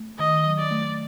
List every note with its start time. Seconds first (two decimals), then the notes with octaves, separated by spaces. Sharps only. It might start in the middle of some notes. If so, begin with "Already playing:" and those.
Already playing: A3
0.19 D#3 D#5
0.45 F#3
0.58 D5
0.71 A3